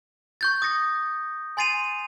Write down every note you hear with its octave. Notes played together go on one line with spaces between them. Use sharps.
C#6 G6 A6
D#6 A6 A#6 C#7
G#5 C6 A6 C7 D#7 F7